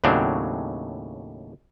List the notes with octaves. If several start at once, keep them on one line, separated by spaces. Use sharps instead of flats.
D#2 A2 C#3 F#3 C4 D4